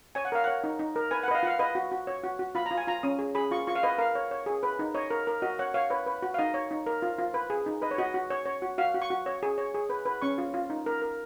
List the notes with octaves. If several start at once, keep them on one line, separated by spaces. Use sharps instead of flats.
C#5 G#5
F#5
A#4 F5
C#5 F#5
D#4
D#4
A#4
B4 G#5
F#5
B4 D#5
F5
F4 F5 F#5
B4 D#5
F#4
F#4
C#5
F#4
F#4
F4 B5
A#5
F4
G#5
F4 A#5
C#4 D#6
G#4
G#4 B5
F4 C#6
F4 C#6
F5
B4 D#5
A#4 F5
C#5
C#5
G#4
B4
D#4
C#5 D#5
A#4
A#4
F#4 D#5
C#5 F#5
C#5 F5
B4 C#5
B4
F#4
F5
D#4 D#5
C#5
D#4
A#4
F4
F4
B4
G#4
D#4
B4 D#5
C#5
F#4 D#5
F#4
C#5
C#5
F#4
F#4 F5
F#4
C#6
F#4
C#5
G#4
C#5
G#4
B4
B4
C#4 C#6
F4
F4
D#4
A#4
A#4